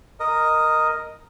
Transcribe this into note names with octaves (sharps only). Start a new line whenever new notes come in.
A#4 D#5